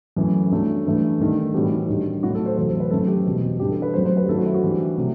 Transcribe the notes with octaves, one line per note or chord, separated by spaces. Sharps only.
F#2 E3 A3
G2 F#3 A3
G2 E3 A3
G2 D#3 A3
A2 E3 G3 F#4
G2 D#3 G3
A2 F#3 A3 F#4
A4
C5
E2 C3 F#3 A3 C5
C5
B4
F#2 D#3 A3 A4
G4
E2 B2 G3 F#4
G2 E3 G3 G4
A4
B4
F#2 F#3 A3 C5
C5
B4
G4
F#2 D#3 F#3 A3 A4
F#4
E4
F#4
G2 E3 G3
C3 F#3 A3